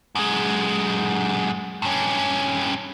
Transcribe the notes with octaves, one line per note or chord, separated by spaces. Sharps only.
F#2 G#3
G2 C#4